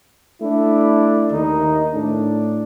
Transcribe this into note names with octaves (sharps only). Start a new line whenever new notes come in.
A3 D4 E4
D#2 D#3 D#4
A2 A3 D4